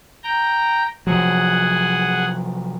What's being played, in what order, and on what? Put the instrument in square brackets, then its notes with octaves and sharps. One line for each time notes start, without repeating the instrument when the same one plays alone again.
[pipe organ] G5 A#5
[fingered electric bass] C3 F3 F#3 [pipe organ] G#4 F#5